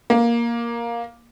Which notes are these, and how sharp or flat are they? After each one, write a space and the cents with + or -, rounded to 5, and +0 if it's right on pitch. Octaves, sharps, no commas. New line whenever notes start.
A#3 +10